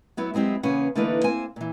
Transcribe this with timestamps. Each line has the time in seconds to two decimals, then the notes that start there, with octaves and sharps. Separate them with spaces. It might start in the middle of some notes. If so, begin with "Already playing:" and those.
0.17 F#3 B3 E4
0.34 F#3 G#3 C4 D#4 G4
0.63 E2 C#3 A#3 C#4 B4 F#5
0.95 D3 E3 A3 A#3 D#4 B4
1.24 A#3 C4 C5 G#5
1.56 A#2 E3